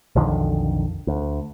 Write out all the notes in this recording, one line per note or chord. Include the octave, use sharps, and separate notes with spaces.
B1 F2 D3 D#3
D2